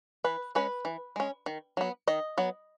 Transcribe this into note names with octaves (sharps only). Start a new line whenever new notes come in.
E3 B4
G#3 C#4 B4
E3
G#3 C#4
D#3
F#3 B3
D#3 D#5
F#3 B3